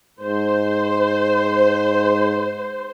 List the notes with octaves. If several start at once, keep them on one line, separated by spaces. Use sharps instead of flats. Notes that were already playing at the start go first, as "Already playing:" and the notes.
G#2 C5